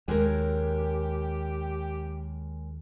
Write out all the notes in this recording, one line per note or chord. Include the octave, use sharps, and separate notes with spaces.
D#2 G#3 C#4 G4 A#4